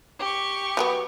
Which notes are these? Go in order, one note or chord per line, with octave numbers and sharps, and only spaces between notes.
G4 C#6
F#3 G#3 B3